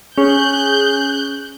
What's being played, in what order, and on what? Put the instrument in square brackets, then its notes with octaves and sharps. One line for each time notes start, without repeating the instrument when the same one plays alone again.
[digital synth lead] C#4 [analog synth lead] G#4 [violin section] F#6 G6